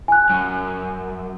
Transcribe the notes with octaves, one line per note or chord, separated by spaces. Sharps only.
G#5 F#6
F#2